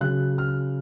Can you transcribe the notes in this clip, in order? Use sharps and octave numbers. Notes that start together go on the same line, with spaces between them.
C#3 F#3 F#6
F6